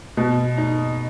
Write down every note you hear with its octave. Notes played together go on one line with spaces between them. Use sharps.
B2
D#4